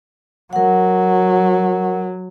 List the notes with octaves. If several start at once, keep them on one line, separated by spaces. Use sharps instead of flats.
F#3 A#4 F#5